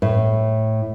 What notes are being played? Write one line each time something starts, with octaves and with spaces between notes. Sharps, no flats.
A2